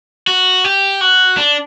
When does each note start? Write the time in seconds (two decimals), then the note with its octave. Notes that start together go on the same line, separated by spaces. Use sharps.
0.27 F#4
0.64 G4
1.01 F#4
1.37 D4